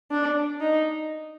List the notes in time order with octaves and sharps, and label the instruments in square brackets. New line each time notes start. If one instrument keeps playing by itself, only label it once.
[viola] D4
D#4